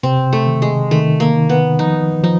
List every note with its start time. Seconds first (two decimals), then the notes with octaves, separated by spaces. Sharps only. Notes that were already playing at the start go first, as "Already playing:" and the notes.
0.03 C3 C4
0.33 A3
0.47 D#3
0.62 G#3
0.91 D#3 A3
1.20 A#3
1.35 D#3
1.49 B3
1.79 F3 D#4
2.23 F3 D#4